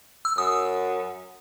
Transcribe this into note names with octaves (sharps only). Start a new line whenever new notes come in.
E6
F#2 D#6